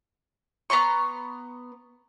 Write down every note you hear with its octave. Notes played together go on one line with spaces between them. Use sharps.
B3 A#5 C6 C#6